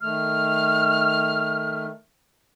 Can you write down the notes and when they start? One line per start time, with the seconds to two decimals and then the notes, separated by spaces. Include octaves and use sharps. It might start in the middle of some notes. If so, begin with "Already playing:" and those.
0.01 D#3 A3 F6